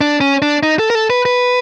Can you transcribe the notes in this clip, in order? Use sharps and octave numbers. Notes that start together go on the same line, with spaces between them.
D4
C#4
D4
D#4
A4
A#4
A4
B4
B4